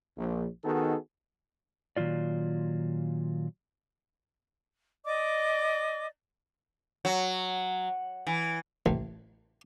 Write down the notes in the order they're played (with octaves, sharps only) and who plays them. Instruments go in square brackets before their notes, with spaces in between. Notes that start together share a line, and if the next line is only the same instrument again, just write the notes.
[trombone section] A#1
D#3 B3 D#4 F#4 G#4 A4
[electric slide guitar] A#2 D#3 F#3 F4 D5
[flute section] D5 D#5 D6
[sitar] F#3
E3
[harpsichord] A1